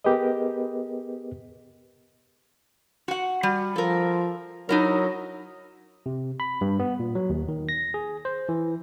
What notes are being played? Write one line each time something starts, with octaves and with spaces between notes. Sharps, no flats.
B3 G4 G#4 A#4 B4 D#5
F#4 F#5
G3 F#4
F3 A4 A#4
F#3 D#4 E4 A#4
C3
B5
G2
B3
A#2
F#3
D#2
D#3
A#6
G#4
C5
E3